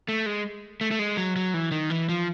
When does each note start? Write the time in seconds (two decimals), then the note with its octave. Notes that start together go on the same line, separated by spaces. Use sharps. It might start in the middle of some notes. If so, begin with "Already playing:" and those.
0.08 A3
0.26 G#3
0.81 A3
0.91 A3
0.99 G#3
1.17 F#3
1.36 F#3
1.54 E3
1.71 D#3
1.90 E3
2.09 F3